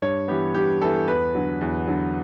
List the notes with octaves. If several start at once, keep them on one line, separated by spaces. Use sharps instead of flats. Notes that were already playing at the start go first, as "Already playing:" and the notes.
G2 C#5
E3 B3 G4
G2 G4
E3 B3 A4
E2 B4
D3 F#3
E2
D3 F#3